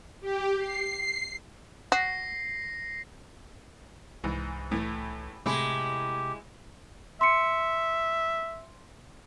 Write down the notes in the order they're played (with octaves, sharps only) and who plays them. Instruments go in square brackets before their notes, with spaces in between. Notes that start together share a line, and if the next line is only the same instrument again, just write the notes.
[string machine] G4
C7
[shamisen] F#4 [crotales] A#6 C7
[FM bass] C2 [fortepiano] G#2 E3
[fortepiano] A2 E3 A3
[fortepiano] A2 [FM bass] C3 [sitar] G#3 E4 [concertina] G4
[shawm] E5 [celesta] C6 C#7